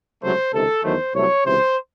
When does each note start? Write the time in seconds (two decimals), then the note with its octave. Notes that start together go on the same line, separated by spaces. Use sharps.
0.22 C#2 C3 F#3 A3 C5
0.53 C#2 C3 D#3 A4
0.83 E2 D#3 F#3 A3 C5
1.14 C2 C3 F#3 A3 C#5
1.44 C#2 C3 E3 C5